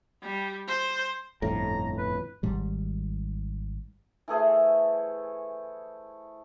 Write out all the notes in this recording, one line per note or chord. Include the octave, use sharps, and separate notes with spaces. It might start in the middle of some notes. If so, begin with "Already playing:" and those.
G3
C5
G1 F2 A2 A#5
B4
G#1 G#2 G3
E3 A3 G#4 C5